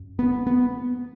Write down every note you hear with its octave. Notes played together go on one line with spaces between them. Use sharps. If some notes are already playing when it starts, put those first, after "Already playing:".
Already playing: F#2
B3
B3